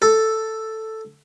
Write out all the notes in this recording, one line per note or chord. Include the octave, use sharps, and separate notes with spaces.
A4